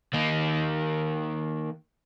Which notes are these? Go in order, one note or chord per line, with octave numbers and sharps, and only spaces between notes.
D#3 A#3